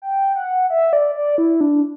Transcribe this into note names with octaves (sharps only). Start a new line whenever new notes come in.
G5
F#5
E5
D5
D5
E4
D4